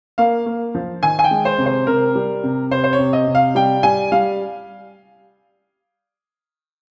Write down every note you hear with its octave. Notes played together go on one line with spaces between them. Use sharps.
A#3 F5
A#3
F3
D#3 G#5
G#5
G5
G#3
C5
C3
C5
C3 A#4
G3
C3
C3 C5
C5
C#5
C3
D#5
C3
F5
G3 G5
G3 G#5
G3 F5